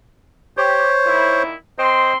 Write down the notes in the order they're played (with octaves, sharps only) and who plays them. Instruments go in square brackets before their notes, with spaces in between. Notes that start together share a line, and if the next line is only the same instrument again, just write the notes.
[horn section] G4 [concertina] C5 C#5
[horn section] A#2 D#3 E4
[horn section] C4 C6 [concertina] C5 D#5